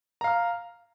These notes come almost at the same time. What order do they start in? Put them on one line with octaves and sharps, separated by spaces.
A#5 F5 F6